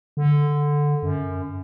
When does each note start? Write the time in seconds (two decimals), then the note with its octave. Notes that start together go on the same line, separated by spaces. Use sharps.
0.17 D3
1.03 F#2